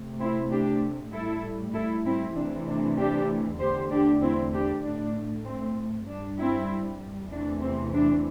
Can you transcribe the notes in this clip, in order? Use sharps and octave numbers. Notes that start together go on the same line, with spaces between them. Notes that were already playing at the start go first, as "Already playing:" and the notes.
Already playing: C3 A3
C4 E4
D4 G4
A2 G3 E4 A4
E4 A4
C4 E4
C3 E3 A3 D4
D4
D4 G4
E2 D3 A3 G4 C5
D4 G4
C4 E4
D4 G4
A2 A3 D4
C4
G2 G3 D4
C4 E4
E2 C3 E3 A3 D4
C4
D4